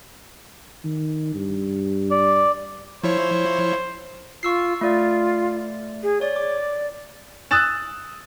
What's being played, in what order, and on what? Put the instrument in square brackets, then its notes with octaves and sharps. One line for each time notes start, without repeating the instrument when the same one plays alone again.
[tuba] D#3
G2
[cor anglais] D5
[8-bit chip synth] F3 E4 C#5 [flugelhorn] C5
[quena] F4 [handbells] C#6 E6 C7
[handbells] A3 D5 [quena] F4
[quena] G#4
[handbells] C#5 [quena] D5
[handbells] D6
[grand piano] D#6 E6 F#6 A6 E7